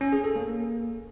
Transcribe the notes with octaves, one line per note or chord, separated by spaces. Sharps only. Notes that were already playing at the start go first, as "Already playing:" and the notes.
C#4
G#4
A4
A#3